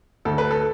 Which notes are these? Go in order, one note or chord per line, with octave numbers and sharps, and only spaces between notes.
D2 A4
B4
A4